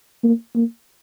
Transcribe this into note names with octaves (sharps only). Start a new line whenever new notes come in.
A#3
A#3